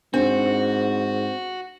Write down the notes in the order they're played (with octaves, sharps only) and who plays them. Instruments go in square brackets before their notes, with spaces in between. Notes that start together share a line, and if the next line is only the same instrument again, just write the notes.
[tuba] G#2 [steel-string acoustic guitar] C4 [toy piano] D4 [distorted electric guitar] F#4